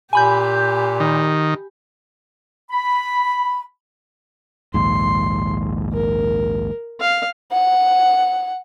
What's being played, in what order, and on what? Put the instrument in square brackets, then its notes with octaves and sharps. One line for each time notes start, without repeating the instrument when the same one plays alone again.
[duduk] A#2 [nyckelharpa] G4 [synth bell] G#5 B5 G6
[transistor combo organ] D#3
[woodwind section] B5
[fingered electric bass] A#1 D#2 G#2 [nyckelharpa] C6
[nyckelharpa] A#4
F5
[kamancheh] F#5